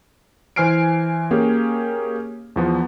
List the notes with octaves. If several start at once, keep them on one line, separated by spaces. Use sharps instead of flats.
E3 C5 G#5 F6 C7 D7
A#3 C#4 G4 G#4
E2 F3 B3